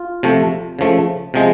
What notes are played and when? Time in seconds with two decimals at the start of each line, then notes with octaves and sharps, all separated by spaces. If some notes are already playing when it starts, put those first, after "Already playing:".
Already playing: F4
0.23 C3 F3 A3
0.79 C#3 F3 A3
1.34 C3 F3 G#3